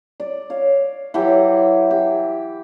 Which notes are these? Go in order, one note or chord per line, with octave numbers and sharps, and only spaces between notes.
D5
C#5 F5
E3 F#3 G4
G4